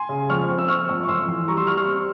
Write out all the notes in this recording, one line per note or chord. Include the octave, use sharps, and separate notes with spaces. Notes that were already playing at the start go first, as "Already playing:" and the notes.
Already playing: G#5 C6
C#3
F2 C#6 F6
C4
E6
C4 C#6 F6
F2
C#6
F2 C6 E6
E3
G3 A#5 C#6
C6 E6
G3 C#6 F6
C#6 F6
C4